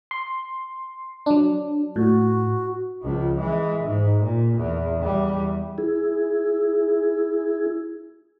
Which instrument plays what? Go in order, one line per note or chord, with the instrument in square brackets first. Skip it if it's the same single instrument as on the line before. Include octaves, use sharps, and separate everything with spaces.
[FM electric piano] C6
F#3 D4
[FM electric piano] A2 [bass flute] F#4
[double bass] C#2 F3
E3 G#3
G#2
A#2
E2
E2 G3
[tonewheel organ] E4 G#4